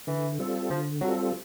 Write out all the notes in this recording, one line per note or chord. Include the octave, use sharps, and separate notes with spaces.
D3 E3
G3 C4 F4 A4
D3 F3
F#3 G3 C4 F4 A4